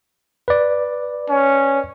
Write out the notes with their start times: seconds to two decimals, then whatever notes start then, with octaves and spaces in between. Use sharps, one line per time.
0.48 B4 D5
1.29 C#4